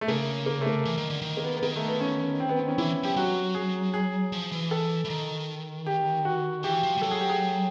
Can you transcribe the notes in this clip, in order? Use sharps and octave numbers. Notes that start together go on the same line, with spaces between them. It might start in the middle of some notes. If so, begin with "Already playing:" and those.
A3
C#3 A#3
A#3
A3
A#3
E3
D#3
D3
D#3
A#3
B3
B3
D#3 A#3
A3
B3
C#4
C4
B3
C4
C#4
E3 E4
F3 G4
F#3 F#4
G#4
G#4
F3
E3
A4
E3
D#3
G4
F#4
E3 G4
F3
G3
F#3 A4
G#4
G4
G#4